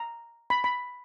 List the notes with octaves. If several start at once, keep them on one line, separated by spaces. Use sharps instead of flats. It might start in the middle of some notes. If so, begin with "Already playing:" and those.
Already playing: A#5
B5
B5